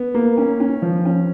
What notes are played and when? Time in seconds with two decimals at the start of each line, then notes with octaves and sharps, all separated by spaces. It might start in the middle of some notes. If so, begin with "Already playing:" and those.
Already playing: B3
0.15 A#3
0.38 C#4
0.60 C#4
0.82 F3
1.05 C#4